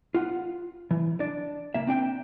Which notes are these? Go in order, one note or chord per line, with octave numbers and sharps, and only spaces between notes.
F4 F#5
E3
D4 D5
C#2 A#3 E5
C4 D4 G5